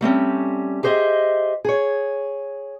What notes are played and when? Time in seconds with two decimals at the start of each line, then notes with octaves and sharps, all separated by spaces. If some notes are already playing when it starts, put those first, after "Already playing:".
0.01 G3 A3 C4 C#4
0.83 G4 G#4 C5 D#5 E5
1.65 G#4 C#5